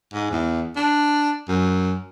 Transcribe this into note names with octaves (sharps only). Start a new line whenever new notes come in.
G#2
E2
D4
F#2